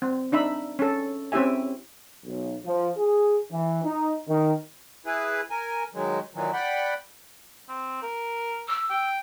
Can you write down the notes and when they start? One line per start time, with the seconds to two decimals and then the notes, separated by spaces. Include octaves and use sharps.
0.02 C4
0.32 D4 D#4 E5 B5
0.79 C#4 A4
1.32 C4 C#4 E4 G4 E5 G#5
2.25 B1
2.65 F3
2.97 G#4
3.51 E3
3.84 D#4
4.28 D#3
5.06 E4 G#4 B4
5.50 A#4 G#5
5.94 D#3 F#3 G#3
6.35 A#2 D#3 E3 F#3
6.53 D5 F#5 G5 B5
7.69 C4
8.02 A#4
8.68 E6
8.90 G5